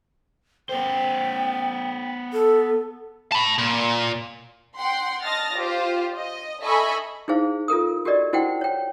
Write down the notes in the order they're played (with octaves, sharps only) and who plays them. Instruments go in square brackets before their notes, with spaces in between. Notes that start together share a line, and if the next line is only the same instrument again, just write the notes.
[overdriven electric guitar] B3 C5 [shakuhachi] G5
[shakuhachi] A4
[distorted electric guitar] A5 B5
A#2
[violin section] F#5 G5 C6
D#5 A5 F6 A6 A#6
F4 G4 C5
D#5
A4 D#5 E5 G#5 B5 C#6
[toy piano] D#4 E4 G#4 C5 F5
F4 A4 A#4 D#6
F#4 G4 A#4 D5 D#5
E4 F#4 C5 F#5 G5
C#5 G5